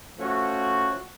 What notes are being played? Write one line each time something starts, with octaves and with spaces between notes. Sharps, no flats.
F3 A3 C#4 F#4